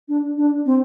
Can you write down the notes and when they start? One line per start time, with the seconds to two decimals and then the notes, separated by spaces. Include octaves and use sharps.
0.08 D4
0.37 D4
0.66 C4